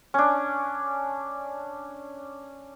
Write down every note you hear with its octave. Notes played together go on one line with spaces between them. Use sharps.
C#4 D4